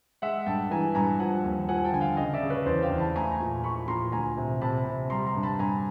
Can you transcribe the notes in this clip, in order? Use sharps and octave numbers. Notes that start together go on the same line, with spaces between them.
G#3 E5 F#5
G2 G5 A5
E3 G#5 A#5
G2 G#5 A#5
F3 F#5 G#5
D#2
F3 F#5 G#5
G5 A5
D3 G#5
F5 G5
C#3 D#5 F5
D5 E5
C#3
B4 C#5
E2 C5 D5
F5 G5
E2
A5 B5
A3 G#5 A#5
G#5 A#5
A#2
F3 B5 C#6
A#2 A#5 C6
D2 G#5 A#5
C3
C3 A5 B5
C3
G3 A#5 C6
A#5 C6
G2
A5 B5
G2 G#5 A#5